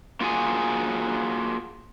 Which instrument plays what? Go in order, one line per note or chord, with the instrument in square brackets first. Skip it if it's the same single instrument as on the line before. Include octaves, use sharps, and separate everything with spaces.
[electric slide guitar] A#3 F4 F#4 G#4 G#5